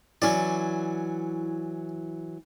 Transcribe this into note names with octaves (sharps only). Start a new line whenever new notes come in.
E3 F#3 C#4 D5